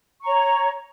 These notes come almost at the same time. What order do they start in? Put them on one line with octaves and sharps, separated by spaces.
C#6 A#5 C#5